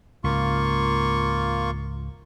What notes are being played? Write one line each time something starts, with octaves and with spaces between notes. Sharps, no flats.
C#2 G#2 A#3 F4 C#6